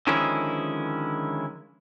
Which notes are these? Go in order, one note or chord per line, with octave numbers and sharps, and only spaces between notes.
D3 D#3 F3 G#3 C#4 E4